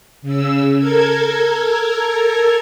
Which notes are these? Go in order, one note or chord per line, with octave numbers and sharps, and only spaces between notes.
C#3 E6
A4 A#4 G#6